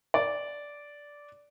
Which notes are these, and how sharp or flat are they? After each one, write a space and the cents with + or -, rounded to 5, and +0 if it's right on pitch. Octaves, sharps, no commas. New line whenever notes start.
D5 -10